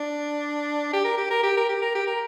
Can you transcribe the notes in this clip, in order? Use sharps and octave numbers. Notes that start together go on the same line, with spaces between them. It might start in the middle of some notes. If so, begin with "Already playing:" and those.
Already playing: D4
G4
A#4
G4
A#4
G4
A#4
G4
A#4
G4
A#4